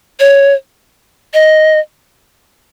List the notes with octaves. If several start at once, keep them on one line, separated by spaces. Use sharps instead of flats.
C#5
D#5